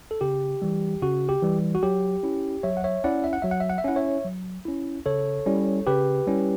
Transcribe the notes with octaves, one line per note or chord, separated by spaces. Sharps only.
A4
C#3 G4
E3 G3
C#3 F#4
G4
E3 G3
F#4
F#3 G4
C#4 E4
F#3 C#5 E5
F#5
C#5 E5
C#4 E4 D5 F#5
E5
F#5
F#3 E5
F#5
E5
F#5
E5
C#4 E4 F#5
C#5 E5
F#3
C#4 E4
C#3 A4 C#5
G3 C#4 E4
C#3 G4 B4
G3 C#4 E4